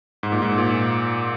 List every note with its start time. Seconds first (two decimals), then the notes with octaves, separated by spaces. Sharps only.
0.23 G#2
0.32 A#2
0.42 G#2
0.58 A#2